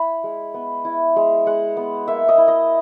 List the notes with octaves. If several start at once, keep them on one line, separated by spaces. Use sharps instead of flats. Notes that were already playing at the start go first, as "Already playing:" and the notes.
Already playing: E4 B5
G#3
B3
E4
G#3
G#3 F#5
B3
A#3 E5
D#5
E4
D#5